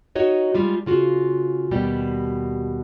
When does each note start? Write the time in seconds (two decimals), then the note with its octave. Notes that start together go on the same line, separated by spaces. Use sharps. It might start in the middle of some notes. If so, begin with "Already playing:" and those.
0.15 D#4 F#4 C#5 D#5
0.54 G3 G#3 F4
0.86 C#3 F4 F#4
1.71 D#2 B2 G3 G4 D5